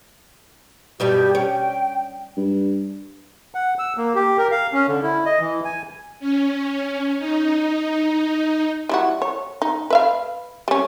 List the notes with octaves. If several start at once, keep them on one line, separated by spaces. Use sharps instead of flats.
G2 B2 G3 G4
C#4 G5
G2
F#5
E6
A#3
G4
A#4
F5
C#4
D3
E4
D#5
E3
G#5
C#4
D#4
G3 E4 F#4
C#5
D#4
B4 E5 F5
G3 C#4